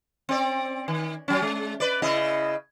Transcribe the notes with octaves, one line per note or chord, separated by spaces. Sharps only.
C4 D5
D#3
F#3 C#4
G#3
B4 D5
C#3 E4 D#5